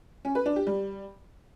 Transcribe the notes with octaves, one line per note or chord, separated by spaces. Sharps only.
C#4
B4
D4
G4
G3